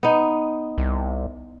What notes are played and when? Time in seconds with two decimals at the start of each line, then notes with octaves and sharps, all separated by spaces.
0.03 B3 D#4
0.78 C2